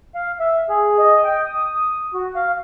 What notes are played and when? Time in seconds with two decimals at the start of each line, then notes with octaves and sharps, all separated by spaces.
0.15 F5
0.40 E5
0.69 G#4
0.99 D#5
1.24 G5
1.46 D#6
2.14 F#4
2.36 F5